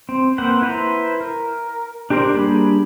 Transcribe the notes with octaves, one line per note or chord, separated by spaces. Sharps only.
C4
A#3 C4 B4 C5 F#5
E4 B4 C5 A#5
A#4
D4 G4 A#4 C5 D5
G3 A#3 D4 G#4 B5